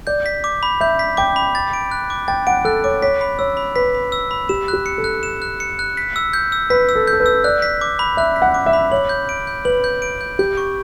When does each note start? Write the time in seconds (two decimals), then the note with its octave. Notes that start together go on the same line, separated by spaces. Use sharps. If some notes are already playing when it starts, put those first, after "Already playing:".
0.07 D5 G6
0.26 B6
0.44 D6
0.63 B5
0.81 E5 G6
0.99 B6
1.17 G5 D6
1.36 B5
1.55 A6
1.73 D7
1.91 F#6
2.10 D6
2.28 G5 A6
2.47 F#5 D7
2.65 A4 F#6
2.84 C#5 D6
3.02 C#5 B6
3.21 B5
3.39 C#5 E6
3.57 B5
3.76 B4 B6
3.94 B5
4.12 E6
4.31 B5
4.49 G4 E7
4.68 F#6
4.73 G4
4.86 C#7
4.98 A4
5.04 F#6
5.23 E7
5.42 F#6
5.60 C#7
5.79 F#6
5.97 B6
6.16 E6
6.33 G6
6.52 E6
6.70 B4 B6
6.89 E6
6.95 A4
7.07 G6
7.13 A4
7.20 B4
7.26 E6
7.44 D5 F#6
7.62 B6
7.81 D6
7.99 B5
8.17 E5 F#6
8.36 B6
8.42 F#5
8.54 D6
8.66 E5
8.73 B5
8.91 C#5 F#7
9.09 G6
9.29 D7
9.47 G6
9.65 B4 F#7
9.84 G6
10.02 D7
10.21 G6
10.39 G4 G6
10.57 C#6